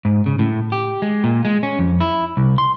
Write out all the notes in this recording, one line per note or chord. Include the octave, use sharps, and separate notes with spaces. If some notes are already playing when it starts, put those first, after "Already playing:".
G#2
C#3
A2
G4
G#3
A#2
G#3
C#4
F2
E4
C2
C6